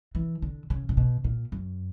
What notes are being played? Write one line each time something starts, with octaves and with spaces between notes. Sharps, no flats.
E3
D3
C#3
A#2
B2
A#2
F#2